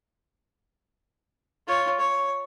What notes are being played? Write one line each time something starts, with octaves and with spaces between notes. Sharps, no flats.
F4 C#5
C#5